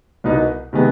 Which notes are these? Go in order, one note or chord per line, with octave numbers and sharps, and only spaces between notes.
C2 B2 B3 D#4
C3 D#3 G#3 B3